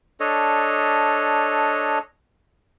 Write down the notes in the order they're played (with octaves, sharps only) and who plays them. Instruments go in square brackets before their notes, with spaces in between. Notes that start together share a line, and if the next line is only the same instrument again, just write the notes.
[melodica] D4 A4 C#5 D#5